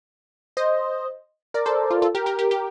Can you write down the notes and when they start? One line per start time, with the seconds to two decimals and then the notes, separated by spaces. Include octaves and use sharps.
0.57 C5 D#5
1.54 A#4 D5
1.66 A4 C5
1.90 F4
2.02 F4 A4
2.15 G4 A#4
2.26 G4 A#4
2.39 G4 A#4
2.51 G4